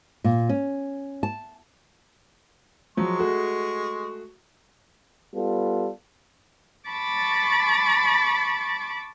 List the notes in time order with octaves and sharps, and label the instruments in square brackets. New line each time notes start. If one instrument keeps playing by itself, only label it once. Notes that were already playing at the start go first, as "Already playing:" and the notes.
[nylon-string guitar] A#2
C#4
A5
[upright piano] F3 F#3 [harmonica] G#3 C#6
[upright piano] A3 F#4 G#4
[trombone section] G3 B3 F4 A4
[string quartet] A5 B5 C#6 D6 A6